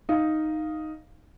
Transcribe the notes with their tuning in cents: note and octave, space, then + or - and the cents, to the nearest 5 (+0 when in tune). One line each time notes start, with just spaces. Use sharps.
D#4 +0 F5 +0